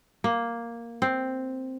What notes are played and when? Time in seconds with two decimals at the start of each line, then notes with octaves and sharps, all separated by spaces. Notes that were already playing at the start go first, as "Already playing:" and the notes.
0.24 A#3
1.02 C4